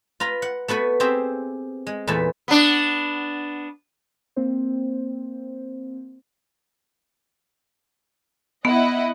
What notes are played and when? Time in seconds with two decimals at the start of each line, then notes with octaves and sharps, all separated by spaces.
0.20 F4 B4 A#5
0.42 F#5
0.68 A3 B3 F#4 B4
1.00 C4 G4 G#4 C5 E5
1.87 G#3
2.07 E2 A#2 A3 B4 A5
2.48 B3 D4
4.36 A#3 C4 C5
8.65 B3 E4 D#5 F#5